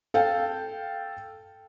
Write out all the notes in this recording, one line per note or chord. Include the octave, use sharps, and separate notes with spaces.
A4 F5 G5